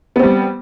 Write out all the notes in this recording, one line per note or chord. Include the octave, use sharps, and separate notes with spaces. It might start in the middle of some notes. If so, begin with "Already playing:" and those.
G3 B3 C4